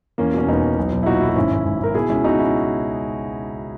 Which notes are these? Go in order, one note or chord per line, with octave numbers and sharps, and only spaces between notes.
E2 A#3 C#4
B2 C#4
E1 B3 D#4
E1
B1
B1
E4
A#2 D#4 F#4
B1 E4
F#4
G#1 C#4 E4
G#1
G#1
G#1 A#4
B2 E4 G#4
C#2 C#4 E4
B2 D#4 F#4
C#4 E4